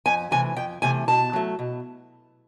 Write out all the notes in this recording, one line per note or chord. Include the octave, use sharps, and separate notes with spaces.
F2 G#5
C3 E3 A3 G#5
F2 G5
C3 E3 A3 G#5
B2 A5
F#3 A3
B2